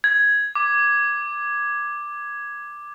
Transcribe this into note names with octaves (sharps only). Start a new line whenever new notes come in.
G#6
D6